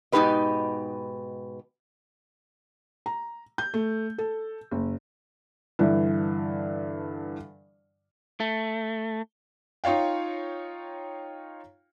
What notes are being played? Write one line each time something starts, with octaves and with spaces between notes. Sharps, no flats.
G#2 B2 D#4 G4 B4 D#5
A#5
G6
A3
A4
F#1
G2 D3 E3
A3
D#4 F4 C#5 F5 G5